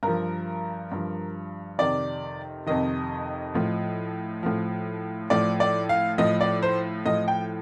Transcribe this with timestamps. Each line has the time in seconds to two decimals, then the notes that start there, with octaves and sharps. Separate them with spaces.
0.03 G2 F3 A#4
0.92 G2 F3
1.78 F2 C3 D#3 D5
2.66 F2 C3 D#3 D#5
3.54 A2 F3
4.43 A2 F3
5.30 A2 F3 D5
5.60 D5
5.89 F5
6.18 A2 F3 D#5
6.41 D5
6.63 C5
7.06 A2 F3 D#5
7.28 G5